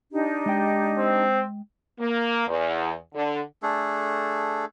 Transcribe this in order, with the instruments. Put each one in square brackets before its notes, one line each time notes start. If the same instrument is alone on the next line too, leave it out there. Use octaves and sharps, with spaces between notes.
[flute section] D4 D#4 G4
[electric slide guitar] G#3 D#5 G5
[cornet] C4
[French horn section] A#3
E2
D3
[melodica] A3 D4 G#4 A4